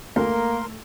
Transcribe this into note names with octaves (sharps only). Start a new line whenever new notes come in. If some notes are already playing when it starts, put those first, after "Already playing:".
D2 A3 A#3 A#4 C6